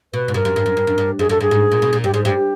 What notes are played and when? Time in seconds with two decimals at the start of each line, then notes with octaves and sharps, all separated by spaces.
0.14 B2 B4
0.28 G#2
0.34 G2 A#4
0.45 F#2
0.56 G2
0.66 F#2
0.77 G2
0.87 F#2
0.98 G2
1.19 F#2 G#4
1.29 F#2 A4
1.41 G2 G#4
1.51 G#2
1.72 A#2
1.82 B2
1.93 A#2
2.04 G2 G4
2.14 G#2 G#4
2.24 G2 G4